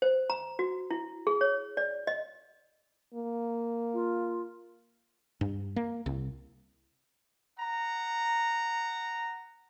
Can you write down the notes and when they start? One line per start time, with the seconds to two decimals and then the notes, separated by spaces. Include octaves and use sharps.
0.02 C5
0.30 A#5
0.59 F#4
0.91 E4
1.27 G#4
1.41 C#5
1.77 D5
2.07 D#5
3.15 A#3
3.94 F4
5.41 G2
5.76 A#3
6.06 C2
7.59 F#5 A#5